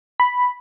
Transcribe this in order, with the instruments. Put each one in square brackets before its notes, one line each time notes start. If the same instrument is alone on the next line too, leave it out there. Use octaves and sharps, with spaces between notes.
[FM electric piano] B5